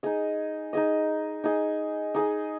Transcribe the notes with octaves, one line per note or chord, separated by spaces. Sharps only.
D#4 G#4 D#5
D#4 G#4 D#5
D#4 G#4 D#5
D#4 G#4 D#5